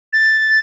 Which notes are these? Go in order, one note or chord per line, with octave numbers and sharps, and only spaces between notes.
A6